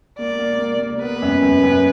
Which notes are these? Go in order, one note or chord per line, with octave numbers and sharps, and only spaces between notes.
A#3 D5
A#3
A#3
A#3
B3 B4
F#2
F#2
F#2